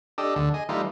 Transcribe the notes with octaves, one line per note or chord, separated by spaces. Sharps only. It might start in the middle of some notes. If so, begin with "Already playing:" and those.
D4 G4 A4 D#5
D2 D3
G#4 D#5
E3 G3 A3 D#4 F4